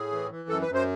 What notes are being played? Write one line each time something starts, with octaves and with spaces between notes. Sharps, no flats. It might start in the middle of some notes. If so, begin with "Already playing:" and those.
Already playing: A2 G#4
E3
E3
F#2 A4
B4
F#2
C5